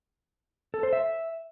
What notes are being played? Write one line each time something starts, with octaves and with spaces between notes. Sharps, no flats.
A4
C5
E5